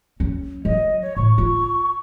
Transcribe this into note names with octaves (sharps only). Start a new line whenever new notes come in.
F#3 C#4
F#3 D#5
C#5
A2 C#6
F4